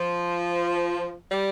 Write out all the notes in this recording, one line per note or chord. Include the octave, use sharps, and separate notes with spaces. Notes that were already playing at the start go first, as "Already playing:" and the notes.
Already playing: F3
G3